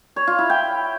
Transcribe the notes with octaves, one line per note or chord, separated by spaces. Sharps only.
C#5
F4
E4
G5